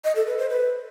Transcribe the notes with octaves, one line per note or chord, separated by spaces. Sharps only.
D#5
A4
B4
C5
B4